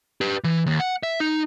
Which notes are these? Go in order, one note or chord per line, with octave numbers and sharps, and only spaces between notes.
G4 B4
E3
D#2
F#5
E5
D#4